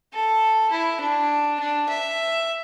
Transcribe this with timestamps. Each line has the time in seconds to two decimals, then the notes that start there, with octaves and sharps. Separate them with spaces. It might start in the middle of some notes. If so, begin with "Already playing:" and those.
0.13 A4
0.71 E4
1.01 D4
1.60 D4
1.89 E5